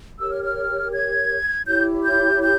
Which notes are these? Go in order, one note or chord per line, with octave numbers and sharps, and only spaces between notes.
G4 A#4 C#5 E6
F6
F6
G#6
E4 G4 C#5 G6
G6
G6